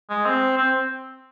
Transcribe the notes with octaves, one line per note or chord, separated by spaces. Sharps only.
G#3
C4
C4